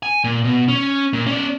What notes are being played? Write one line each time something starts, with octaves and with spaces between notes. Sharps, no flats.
G#5
A#2
B2
C#4
A#2
C#4 D5